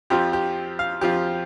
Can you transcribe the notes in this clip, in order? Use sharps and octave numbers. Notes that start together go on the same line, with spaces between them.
F2 F3 C4 F4 G4
G4
F5
F2 F3 C4 F4 G4